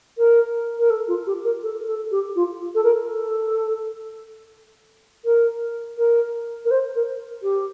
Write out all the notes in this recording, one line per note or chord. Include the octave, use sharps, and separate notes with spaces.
A#4
A#4
A4
F4
G4
A#4
A4
A4
G4
F4
A4
A#4
A4
A#4
A#4
A#4
C5
A#4
G4